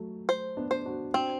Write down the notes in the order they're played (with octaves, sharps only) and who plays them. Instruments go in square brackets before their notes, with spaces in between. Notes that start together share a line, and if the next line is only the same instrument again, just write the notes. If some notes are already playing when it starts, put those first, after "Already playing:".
Already playing: [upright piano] F#3 A3
[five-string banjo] C5
[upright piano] B3 D4
[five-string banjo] C5
[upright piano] D4 F#4
[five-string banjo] C4 [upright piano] D4 F#4